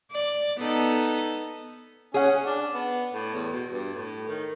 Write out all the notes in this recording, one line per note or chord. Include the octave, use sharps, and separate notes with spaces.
D5
B3 D#4 A4
C#4 G#4 F#5
D4
B3
A2
E2
B2
G2
A2
D#3